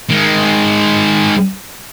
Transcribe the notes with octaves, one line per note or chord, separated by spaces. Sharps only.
D#3 G#3